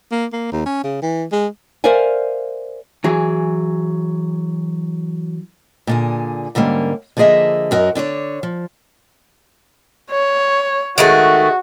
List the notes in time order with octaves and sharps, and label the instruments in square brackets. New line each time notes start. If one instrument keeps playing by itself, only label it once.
[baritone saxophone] A#3
A#3
D#2
C#4
C#3
E3
G#3
[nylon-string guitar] A#4 C5 D5 E5 F5 G#5
[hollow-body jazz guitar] E3 F#3 G#4
[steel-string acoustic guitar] A#2 D3 G#4
G#2 D3 G3 A#3 C#4
D3 F3 A#3 G#4 D#5 E5
F#2 F#4 A#4 D#5
D3 D4 C5 C#5
F3
[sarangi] C#5
[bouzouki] D#3 G#3 A3 [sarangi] F#4